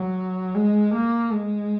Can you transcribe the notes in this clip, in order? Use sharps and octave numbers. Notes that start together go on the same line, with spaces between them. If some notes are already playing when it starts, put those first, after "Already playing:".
Already playing: F#3
G#3
A#3
G#3